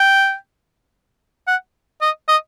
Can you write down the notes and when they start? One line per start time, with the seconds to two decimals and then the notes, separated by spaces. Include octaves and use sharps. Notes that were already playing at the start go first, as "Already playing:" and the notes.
Already playing: G5
1.47 F#5
2.02 D#5
2.28 D#5